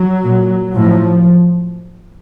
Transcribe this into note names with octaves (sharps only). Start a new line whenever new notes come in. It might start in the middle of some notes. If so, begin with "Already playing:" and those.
Already playing: F#3
A#2
A2 F3